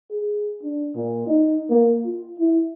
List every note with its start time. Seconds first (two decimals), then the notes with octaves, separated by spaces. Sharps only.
0.10 G#4
0.63 D4
0.95 A#2
1.27 D#4
1.70 A#3
2.05 F4
2.39 E4